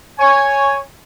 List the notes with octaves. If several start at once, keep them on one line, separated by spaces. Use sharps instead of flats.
C#5 G#5